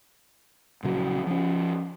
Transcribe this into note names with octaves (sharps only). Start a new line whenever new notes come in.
A#1 C#3 F#3
F3 C#4